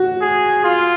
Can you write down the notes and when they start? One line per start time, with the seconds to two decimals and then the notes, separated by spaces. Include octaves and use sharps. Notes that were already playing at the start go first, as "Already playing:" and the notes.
Already playing: F#4
0.21 G#4
0.64 F4